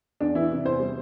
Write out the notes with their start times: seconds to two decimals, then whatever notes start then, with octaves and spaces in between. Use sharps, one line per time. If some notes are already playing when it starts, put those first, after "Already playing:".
0.21 E2 D4
0.35 E3 E4
0.51 C3
0.65 E2 C5
0.80 G3